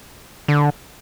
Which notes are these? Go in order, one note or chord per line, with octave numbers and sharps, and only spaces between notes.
D3